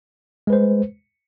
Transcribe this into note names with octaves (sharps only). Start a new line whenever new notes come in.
G#3 B4 C5